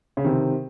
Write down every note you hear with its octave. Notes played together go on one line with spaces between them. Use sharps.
C#3
C3 D#3